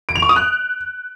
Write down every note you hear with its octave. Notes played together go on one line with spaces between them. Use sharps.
D7
F7
C#6
D#6
F#6